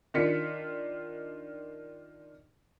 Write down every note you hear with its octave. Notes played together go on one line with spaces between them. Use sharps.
D#3 D4 F4 B6 C#7